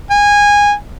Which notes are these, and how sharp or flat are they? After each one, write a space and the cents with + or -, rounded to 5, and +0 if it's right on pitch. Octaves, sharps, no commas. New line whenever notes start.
G#5 -20